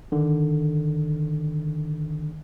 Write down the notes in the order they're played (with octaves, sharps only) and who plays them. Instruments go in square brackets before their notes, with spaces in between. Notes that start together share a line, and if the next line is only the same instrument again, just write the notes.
[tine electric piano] D3 D#3